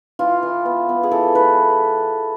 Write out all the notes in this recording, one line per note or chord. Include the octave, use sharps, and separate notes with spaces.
E3 F4
E3
B3
B3
G#4
E3 A4
E3 B4